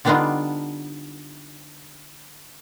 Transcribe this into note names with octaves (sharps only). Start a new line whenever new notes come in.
D3 G3 B3 D4 D#4 F4